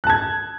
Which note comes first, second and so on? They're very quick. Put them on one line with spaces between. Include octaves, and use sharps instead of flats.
F#6 A5 G#6